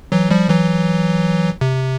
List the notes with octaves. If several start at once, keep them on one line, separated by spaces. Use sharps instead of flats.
E3 F#3
F3 G3
E3 F#3
C3